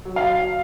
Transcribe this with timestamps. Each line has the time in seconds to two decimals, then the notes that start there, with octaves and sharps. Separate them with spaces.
0.05 F#3
0.16 F5